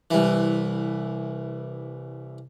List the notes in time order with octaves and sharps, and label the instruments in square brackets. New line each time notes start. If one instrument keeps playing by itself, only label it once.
[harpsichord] C2 E3